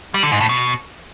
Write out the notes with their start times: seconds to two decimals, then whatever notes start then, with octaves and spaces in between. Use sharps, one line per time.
0.14 G3
0.23 D3
0.32 G#2
0.41 A2
0.49 B2